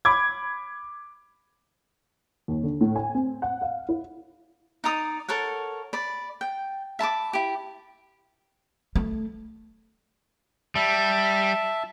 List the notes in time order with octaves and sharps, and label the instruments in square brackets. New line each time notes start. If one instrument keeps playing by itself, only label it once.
[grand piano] B5 D6 G#6
[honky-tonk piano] D#2
D3
A2
G#5
C4
F#5
F5
E4
[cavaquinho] D#4 D5 A#5 D#6
A4 A#4 C#5 F#5
D5 B5
G5
E5 A5 B5 D6
E4 G4
[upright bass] A3
[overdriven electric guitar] G3 [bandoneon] E5 A5